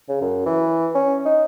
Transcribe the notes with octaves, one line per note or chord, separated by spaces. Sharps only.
C#3
F#2
E3
C#4
D#4